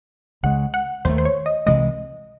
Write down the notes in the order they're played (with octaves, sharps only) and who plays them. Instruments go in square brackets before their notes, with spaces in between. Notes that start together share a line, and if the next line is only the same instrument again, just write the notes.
[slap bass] C#2 C#3 G#3 [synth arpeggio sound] F#5
[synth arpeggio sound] F#5
[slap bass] D#2 D#3 A3 [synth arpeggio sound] C5
[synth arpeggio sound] C5
C#5
D#5
[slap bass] C2 C3 E3 G#3 [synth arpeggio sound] D#5